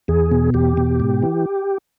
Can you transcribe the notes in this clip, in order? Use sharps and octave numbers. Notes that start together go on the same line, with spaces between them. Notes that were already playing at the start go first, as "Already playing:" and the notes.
E2 G#4
B2
E2 G4
B2
G#2
E3